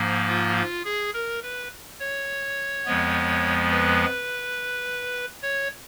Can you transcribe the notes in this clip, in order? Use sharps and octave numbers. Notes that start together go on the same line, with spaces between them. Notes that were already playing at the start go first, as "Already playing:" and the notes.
Already playing: G#2 F3 A#3
F4
F4
G#4
A#4
B4
C#5
F2 F3 G#3 B3
B4
C#5